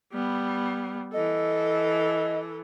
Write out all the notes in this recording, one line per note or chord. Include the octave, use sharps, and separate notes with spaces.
G3 B3
E3 A4 D#5